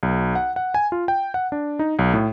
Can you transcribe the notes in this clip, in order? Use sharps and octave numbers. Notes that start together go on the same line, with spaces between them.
B1
F#5
F#5
G#5
F4
G5
F#5
D4
D#4
B1
A2